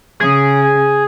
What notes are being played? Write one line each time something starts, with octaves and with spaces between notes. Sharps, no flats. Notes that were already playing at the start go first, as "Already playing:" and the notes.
C#3 G#4